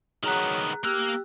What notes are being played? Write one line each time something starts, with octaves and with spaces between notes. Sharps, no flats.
D#3 F#3 B3 G#4 A#5 F#6
A#3 G4 A#4 E6 F#6